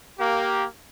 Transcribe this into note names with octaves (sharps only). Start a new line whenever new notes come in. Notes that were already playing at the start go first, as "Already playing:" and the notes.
A#3 G4